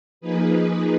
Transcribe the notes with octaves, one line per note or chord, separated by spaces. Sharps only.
F3 A#3 D#4 G#4 B4